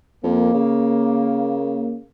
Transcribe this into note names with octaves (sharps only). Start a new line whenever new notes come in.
F2 A#3
C#3